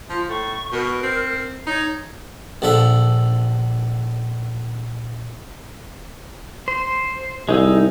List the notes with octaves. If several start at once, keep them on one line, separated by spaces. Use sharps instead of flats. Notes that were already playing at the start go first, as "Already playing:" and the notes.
F3 F4
A2 C#6
B2 A#4
C4
D#4 C#5
A#1 D3 F3 E5
C5
C2 G#3 D#4 E6